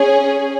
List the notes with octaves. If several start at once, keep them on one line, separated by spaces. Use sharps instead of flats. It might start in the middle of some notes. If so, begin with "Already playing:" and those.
Already playing: C#4 G#4